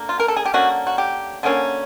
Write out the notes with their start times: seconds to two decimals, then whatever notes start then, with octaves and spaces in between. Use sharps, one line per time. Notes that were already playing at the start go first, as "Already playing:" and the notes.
Already playing: D3 A#3
0.09 F4
0.20 A#4
0.28 A4
0.37 G#4
0.46 G4
0.54 D3 F#3 A#3 C#4 F#4
0.87 F#4
0.98 G4
1.43 D3 F#3 A#3 C#4